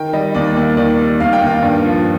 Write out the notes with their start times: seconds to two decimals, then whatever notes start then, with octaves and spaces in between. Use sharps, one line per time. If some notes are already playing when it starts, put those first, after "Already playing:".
Already playing: D#3 G5
0.13 G3 D#5
0.35 D#2 D5
0.57 D#2
0.77 D#3 D5
0.99 G3
1.20 D#2 F5
1.33 G5
1.41 D#2
1.47 F5
1.62 G2
1.84 F3